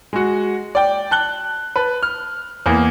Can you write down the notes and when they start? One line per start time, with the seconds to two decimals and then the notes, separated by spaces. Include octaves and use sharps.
0.13 G#3 F#4
0.75 D5 G5
1.11 A5 F#6 G7
1.76 B4 A5
2.03 F6
2.66 E2 A#3